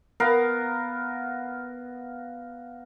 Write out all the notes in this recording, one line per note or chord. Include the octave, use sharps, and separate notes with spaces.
B3 A#4 F5